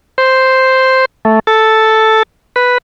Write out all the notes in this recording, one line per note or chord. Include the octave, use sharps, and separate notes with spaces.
C5
A3
A4
B4